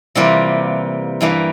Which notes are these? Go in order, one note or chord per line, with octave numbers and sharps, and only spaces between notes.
C3 E3 G3 A#3 F4
G2 E3 G3 A#3